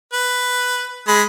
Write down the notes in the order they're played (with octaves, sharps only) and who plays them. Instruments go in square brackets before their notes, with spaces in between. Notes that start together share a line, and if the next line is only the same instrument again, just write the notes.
[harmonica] B4
G#3 B5